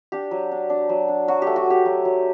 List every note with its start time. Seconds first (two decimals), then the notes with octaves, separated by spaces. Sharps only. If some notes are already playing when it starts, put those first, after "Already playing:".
0.12 D4 G4
0.31 F#3
0.52 D4
0.70 D4
0.89 F#3
1.08 D4
1.28 F#3 F#4
1.42 G4
1.47 A3
1.56 F#4
1.66 A3 G4
1.85 F#3
2.05 F#3